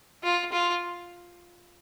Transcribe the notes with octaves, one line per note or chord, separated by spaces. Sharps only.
F4
F4